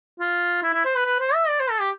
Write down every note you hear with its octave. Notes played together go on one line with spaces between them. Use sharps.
F4
E4
E4
C5
B4
B4
C5
E5
D5
C5
A4
G4